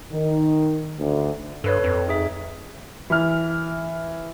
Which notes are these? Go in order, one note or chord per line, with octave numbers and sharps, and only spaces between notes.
D#3
D2
G2 A4 B4 C#5
F2
D#4 G#4 E5
E3 F6